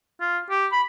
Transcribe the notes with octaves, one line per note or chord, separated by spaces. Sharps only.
F4
G4
B5